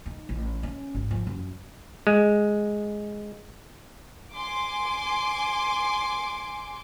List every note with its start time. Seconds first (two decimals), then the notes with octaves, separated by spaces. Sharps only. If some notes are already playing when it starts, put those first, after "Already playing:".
0.06 D#4
0.29 A1
0.63 C#4
0.95 G#1
1.11 F3
1.27 F#2
2.07 G#3
4.34 G#5 C6 D6